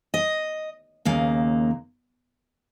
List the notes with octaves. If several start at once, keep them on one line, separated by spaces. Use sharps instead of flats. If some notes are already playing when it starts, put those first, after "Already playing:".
D#5
D#2 C#3 A#3